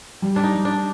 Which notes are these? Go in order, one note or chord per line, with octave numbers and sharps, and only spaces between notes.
G3
D4
D#4
G3
D4